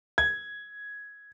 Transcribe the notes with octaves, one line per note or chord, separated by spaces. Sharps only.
G#6